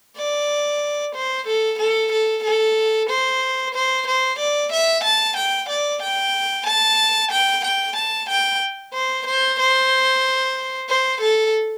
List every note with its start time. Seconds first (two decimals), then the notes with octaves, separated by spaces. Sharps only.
0.17 D5
1.15 C5
1.47 A4
1.79 A4
2.12 A4
2.44 A4
3.10 C5
3.74 C5
4.07 C5
4.39 D5
4.72 E5
5.04 A5
5.37 G5
5.69 D5
6.02 G5
6.66 A5
7.31 G5
7.64 G5
7.96 A5
8.29 G5
8.94 C5
9.26 C5
9.60 C5
10.89 C5
11.21 A4